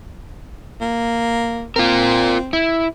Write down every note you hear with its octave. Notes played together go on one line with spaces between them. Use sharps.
A#3
C4 F4 A#4
E4